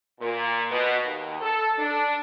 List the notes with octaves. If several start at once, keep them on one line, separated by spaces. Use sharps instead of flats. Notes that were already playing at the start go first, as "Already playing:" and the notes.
A#2
B2
D#2
A4
D4